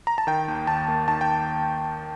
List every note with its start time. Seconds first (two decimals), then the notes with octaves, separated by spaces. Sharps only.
0.07 A#5
0.18 A5
0.27 D#3 G5
0.48 D#2
0.67 D#2 A5
0.88 A#3
1.08 D#3 A5
1.21 G5